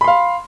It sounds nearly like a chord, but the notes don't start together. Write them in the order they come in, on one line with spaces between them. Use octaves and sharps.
B5 C6 F5